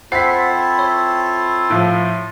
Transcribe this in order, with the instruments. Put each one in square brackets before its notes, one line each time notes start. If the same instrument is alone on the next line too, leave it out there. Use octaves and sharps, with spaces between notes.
[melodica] C4 E4 A4 [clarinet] F4 [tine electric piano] C5 F#5 [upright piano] B6 C7
[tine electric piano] C#5 B5
[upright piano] A2 F3